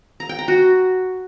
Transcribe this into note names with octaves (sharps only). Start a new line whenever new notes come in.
A#5
G5
A#5
F#4